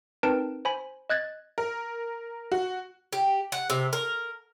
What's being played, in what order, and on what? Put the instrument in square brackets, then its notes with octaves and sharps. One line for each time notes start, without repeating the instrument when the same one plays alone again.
[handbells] C4 D#4 A#4 B4 A5 D7
C5 G#5 B5
D#5 F#6 G#6 A6
[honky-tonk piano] A#4
F#4
[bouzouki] G4
F#5
C3
A#4